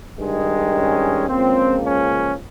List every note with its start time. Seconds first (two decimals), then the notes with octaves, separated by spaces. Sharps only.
0.18 G2 D#3 G#3
0.74 C#4
1.27 C#2 C#3 F3 A#3 C4
1.83 C#4